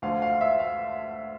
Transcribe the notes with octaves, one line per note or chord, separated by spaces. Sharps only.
D2 D3 F3 F5
F5
E5
F5